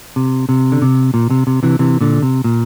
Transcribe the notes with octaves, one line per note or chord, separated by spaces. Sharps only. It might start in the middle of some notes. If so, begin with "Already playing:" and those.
C3
C3
D3
C3
A#2
C3
C3
C3 E3
C3 E3
A#2 D3
C3
A#2